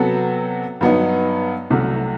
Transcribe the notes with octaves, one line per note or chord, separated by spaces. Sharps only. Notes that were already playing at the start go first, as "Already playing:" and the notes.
Already playing: C3 F#3 B3 F#4 A4
G2 F#3 B3 D#4
C2 C3 F#3 A3